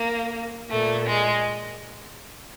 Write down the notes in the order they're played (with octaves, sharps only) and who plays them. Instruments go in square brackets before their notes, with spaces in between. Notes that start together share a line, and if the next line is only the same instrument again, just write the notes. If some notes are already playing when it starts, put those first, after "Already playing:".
Already playing: [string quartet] A#3
A#2 A3
G#3